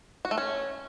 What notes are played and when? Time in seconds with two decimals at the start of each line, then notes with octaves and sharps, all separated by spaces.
0.25 F#4
0.31 A3
0.38 C#4